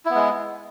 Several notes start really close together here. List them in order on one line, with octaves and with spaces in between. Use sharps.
E4 B3 G#3